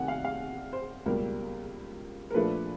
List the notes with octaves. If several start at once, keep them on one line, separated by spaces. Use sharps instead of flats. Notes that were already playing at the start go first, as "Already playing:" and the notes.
Already playing: C2 C3 D#3 F#5 G#5
F5
F5
C5
C#2 B2 G3 A#3 A#4
A#4
A#2 F3 A3 D4 B4